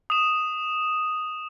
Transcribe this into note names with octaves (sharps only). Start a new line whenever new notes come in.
D#6 E7